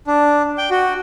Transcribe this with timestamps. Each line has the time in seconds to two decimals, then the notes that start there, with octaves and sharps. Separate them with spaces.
0.07 D4
0.58 G5
0.71 F#4